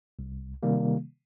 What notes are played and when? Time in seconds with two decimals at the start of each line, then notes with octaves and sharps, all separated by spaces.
0.19 C2
0.63 C3 D#3 G3 A#3